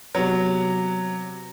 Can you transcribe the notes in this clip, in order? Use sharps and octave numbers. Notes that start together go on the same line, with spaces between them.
C3 F#3 G3 B3